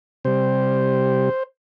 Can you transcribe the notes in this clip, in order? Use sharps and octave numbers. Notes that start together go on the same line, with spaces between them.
C3 G3 C5